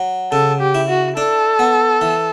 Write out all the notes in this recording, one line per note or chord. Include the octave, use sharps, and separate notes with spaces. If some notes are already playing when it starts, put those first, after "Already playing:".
Already playing: F#3
C#3 A4
G4
E4
F#4
D4 A4
B3
E3